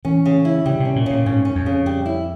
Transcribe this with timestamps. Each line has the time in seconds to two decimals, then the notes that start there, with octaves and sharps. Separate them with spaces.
0.05 E3 C#4
0.26 C#3
0.45 E4
0.66 C#3 G3
0.80 C3
0.85 C#4
0.96 A#2
1.06 A#2 C#3
1.26 G#2 C#4
1.45 C#4
1.55 F2
1.66 C#3
1.86 G3
2.06 E4